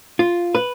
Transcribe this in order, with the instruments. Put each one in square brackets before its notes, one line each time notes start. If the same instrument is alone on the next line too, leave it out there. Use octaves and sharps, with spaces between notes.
[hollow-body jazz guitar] F4
B4